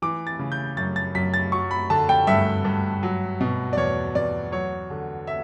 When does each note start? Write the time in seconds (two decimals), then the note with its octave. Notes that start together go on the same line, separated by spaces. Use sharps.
0.02 E3 D6
0.27 A6
0.39 C#3
0.52 G6
0.77 F#2 A6
0.96 A6
1.15 F#2 B6
1.34 A6
1.52 F#3 C#6
1.71 B5
1.90 D3 A5
2.09 G5
2.27 G2 E5
2.64 G2
3.03 F#3
3.41 B2
3.73 D5
3.77 E2 C#5
4.15 E2 D5
4.52 F#3 C#5
4.90 D3
5.27 E5